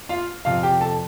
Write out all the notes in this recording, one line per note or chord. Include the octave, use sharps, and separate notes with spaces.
F4 F5
F2 C3 F3 F4 F5
G4 G5
A4 A5